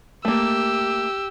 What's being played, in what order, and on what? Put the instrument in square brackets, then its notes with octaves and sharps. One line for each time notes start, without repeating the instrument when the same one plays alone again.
[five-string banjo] A3 A#3 [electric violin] G4 E6